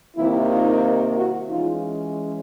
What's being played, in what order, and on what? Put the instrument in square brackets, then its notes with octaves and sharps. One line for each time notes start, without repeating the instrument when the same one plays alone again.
[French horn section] C3 D#3 G3 A#3 E4
D#4 F4
E4 F#4
E3 G#3 C#4 D#4 F4